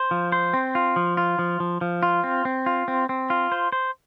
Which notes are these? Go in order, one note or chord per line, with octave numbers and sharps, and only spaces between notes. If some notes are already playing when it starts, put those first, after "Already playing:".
Already playing: C5
F3
C5
C4
F4
F3
F4
F3
F3
F3
F4
C4
C4
F4
C4
C4
F4
C5
C5